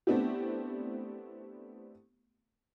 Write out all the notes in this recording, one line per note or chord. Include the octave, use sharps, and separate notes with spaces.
A3 B3 C4 D4 E4 G4